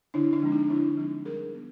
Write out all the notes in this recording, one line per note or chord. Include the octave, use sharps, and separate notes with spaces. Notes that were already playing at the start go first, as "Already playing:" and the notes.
D3 D4 E4
D4
F3 G#3 C4
D#4
D3 D4 E4
F3 G#3 C4
G3 G#4 A#4
B3 D4